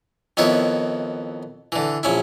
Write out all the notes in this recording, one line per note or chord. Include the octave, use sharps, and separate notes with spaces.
F2 D#3 B3 E4 C#5
D3 E3
A#1 C#4 E4